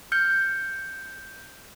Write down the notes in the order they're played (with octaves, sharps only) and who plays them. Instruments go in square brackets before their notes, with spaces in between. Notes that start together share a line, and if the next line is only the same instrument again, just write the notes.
[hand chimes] F6 G6 C#7